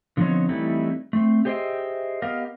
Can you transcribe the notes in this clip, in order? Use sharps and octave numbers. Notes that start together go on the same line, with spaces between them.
D3 F3 B3 C4 D#4 C#5
E3 G3 A3 C4 D#4 E4
A3 C4
G4 G#4 C5 D#5 E5 G5
B3 G4 A#4 D#5 F5